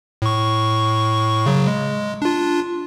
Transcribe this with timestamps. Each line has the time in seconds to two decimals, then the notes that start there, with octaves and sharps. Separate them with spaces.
0.22 A2 C#6
1.46 C#3 F#3
1.67 G#3
2.22 D4 F4